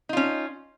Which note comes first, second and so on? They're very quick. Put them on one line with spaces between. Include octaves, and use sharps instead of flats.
D#4 F4 C#4